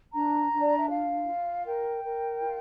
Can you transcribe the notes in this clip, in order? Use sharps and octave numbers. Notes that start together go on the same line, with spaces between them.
D4 A#5
D4
D5
E5
F4 F5
F4
A#4 G5
A#4
F4